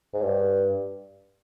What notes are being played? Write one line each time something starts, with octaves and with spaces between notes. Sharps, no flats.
G#2
G2